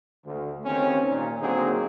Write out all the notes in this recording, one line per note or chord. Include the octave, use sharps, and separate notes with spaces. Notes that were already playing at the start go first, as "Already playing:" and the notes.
D2
D#2 C4 C#4
A#2
D3 F#3 A#3 C4 D#4 G#4